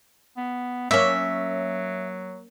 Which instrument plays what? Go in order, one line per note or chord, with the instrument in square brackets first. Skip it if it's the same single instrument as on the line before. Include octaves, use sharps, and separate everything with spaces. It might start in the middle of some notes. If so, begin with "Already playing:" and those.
[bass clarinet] B3
[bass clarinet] F#3 [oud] A#3 C#4 [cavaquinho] E5